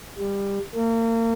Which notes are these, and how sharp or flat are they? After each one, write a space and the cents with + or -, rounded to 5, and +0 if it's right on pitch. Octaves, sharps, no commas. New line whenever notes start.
G3 +20
A#3 -35